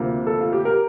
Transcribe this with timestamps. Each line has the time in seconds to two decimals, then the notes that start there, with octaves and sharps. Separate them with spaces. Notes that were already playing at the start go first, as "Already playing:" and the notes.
Already playing: D2 C3 F3 A#3
0.27 A4
0.40 F4
0.53 G4
0.65 A#4